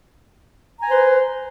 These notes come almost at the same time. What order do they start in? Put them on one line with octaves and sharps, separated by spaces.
A#5 G#5 C5 B4